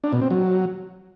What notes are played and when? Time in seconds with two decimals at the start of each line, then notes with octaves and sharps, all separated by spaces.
0.04 D4
0.13 B2
0.22 C4
0.30 F#3